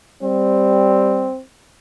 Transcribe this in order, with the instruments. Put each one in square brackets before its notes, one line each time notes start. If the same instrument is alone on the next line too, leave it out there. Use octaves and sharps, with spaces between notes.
[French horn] G3 [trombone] C4